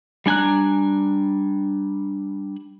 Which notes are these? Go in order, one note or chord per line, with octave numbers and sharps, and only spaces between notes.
G3 D4 G#5 A#5 F#6